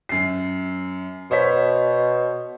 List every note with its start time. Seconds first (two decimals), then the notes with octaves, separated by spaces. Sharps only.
0.09 F#2 C7
1.31 B2 C5 C#5 B6